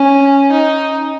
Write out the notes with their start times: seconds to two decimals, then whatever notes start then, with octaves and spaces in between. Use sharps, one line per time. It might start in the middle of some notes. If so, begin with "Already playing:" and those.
Already playing: C#4
0.51 D#4